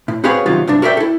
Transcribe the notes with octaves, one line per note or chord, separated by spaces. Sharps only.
A2
C4 F#4 G#4 B4 C#5 F5
F#2 C3 D#3 F#3 F4
C2 G2 D4
F#4 A#4 B4 D5 E5 G5
E4 A4